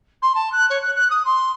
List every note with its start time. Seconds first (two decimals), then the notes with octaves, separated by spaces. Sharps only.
0.22 C6
0.35 A5
0.52 F#6
0.70 C#5
0.83 F#6
0.96 F#6
1.10 D#6
1.25 C6